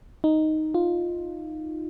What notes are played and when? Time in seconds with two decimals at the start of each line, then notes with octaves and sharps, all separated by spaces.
0.24 D#4
0.74 F4